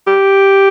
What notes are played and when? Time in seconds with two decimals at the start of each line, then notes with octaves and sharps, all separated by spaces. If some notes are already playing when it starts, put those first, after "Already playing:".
0.07 G4